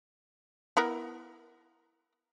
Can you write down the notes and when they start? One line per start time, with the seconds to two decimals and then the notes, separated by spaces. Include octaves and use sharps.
0.77 B3 E4 A#4